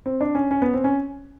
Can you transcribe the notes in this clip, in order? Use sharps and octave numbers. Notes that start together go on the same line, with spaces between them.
C4
D4
C#4
C#4
B3
C4
C#4